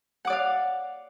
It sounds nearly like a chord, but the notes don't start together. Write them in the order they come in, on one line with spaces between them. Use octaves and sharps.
F#5 D6 D5 F5